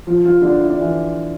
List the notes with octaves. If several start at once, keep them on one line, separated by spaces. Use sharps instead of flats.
F3 F4
F3 F4
D3 D4
E4
D4
E3 E4